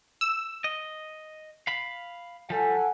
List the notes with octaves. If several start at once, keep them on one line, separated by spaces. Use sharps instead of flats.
E6
D#5
F5 B5
F3 G3 A4 F#5 G#5